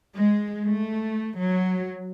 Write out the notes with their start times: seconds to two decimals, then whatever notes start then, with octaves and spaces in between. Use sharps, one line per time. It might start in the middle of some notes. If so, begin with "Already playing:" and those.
0.17 G#3
0.67 A3
1.40 F#3